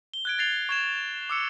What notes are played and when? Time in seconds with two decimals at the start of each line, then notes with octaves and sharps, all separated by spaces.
0.14 G7
0.25 F#6 G#6 D7
0.38 G#6 A6 C7 F7 G7
0.69 C#6 G#6 E7
1.30 D6 E6 C#7